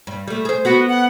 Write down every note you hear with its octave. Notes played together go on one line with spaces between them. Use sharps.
G2
G3 A3
G#4 C5
B3 F#4
F#5